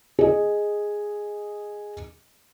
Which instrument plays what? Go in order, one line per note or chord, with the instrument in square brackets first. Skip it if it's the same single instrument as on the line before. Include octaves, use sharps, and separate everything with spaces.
[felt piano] G#4 D#5